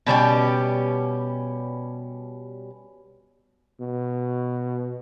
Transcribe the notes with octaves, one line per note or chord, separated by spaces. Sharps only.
B2 G3 C#4 G4
B2